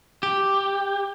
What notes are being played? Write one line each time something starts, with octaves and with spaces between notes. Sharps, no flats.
G4